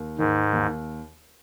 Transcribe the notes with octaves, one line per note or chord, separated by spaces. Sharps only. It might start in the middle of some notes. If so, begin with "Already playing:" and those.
Already playing: D#2
G#2 D#3
D#2